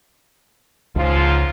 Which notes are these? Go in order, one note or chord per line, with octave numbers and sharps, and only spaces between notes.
C#2 G#2 C#3 F3 F4